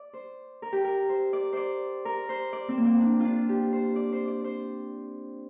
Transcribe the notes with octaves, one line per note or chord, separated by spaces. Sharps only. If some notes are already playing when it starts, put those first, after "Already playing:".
Already playing: D5
C5
A#4
G4
A#4
C5
D5
C5 D5
A#4
C5
D5
C4
A#3
C4
D4
D4 F4
G4
C5
D5
C5
D5
C5